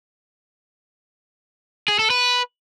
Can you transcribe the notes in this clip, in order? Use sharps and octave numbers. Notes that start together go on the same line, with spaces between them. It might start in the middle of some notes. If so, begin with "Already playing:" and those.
G#4
A4
B4